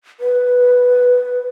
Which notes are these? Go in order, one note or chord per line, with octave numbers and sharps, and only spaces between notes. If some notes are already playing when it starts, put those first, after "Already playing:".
B4